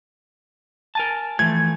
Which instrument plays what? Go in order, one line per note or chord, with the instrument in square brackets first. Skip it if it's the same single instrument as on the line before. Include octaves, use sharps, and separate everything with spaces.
[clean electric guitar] A#4 G#5 A5
[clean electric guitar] E3 F3 A3 [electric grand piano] G#6